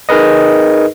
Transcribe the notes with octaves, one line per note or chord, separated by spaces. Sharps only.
D#4 G#4 A#4 B4 D#5